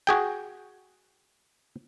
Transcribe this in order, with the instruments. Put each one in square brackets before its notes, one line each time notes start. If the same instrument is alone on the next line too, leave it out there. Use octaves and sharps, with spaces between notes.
[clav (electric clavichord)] F#4 G#4 G5